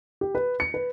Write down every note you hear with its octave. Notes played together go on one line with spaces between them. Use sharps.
G4
B4
C#7
B4